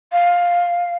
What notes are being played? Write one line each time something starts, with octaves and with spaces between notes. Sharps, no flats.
F5